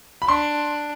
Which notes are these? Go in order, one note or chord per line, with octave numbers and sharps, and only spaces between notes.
B5
D4 C6